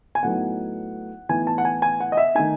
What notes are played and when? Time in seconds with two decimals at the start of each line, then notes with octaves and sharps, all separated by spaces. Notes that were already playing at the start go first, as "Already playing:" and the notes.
0.15 G#5
0.23 A2 F#3 B3 D#4 F#5
1.29 A2 E3 B3 D#4 G#5
1.47 A5
1.58 F#5
1.65 G#5
1.82 G#5
2.00 F#5
2.12 D#5
2.17 E5
2.35 D#3 A3 D#4 G#5